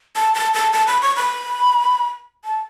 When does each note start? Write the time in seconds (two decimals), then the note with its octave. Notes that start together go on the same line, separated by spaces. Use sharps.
0.16 A5
0.35 A5
0.54 A5
0.73 A5
0.88 B5
1.02 C#6
1.16 B5
2.44 A5